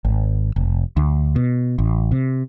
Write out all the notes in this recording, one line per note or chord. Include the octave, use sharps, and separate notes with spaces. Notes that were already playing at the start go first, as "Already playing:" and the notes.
G#1
F1
D2
B2
A1
C3